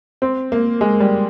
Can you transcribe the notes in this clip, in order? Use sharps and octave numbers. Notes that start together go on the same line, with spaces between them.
C4
A#3
G#3
G3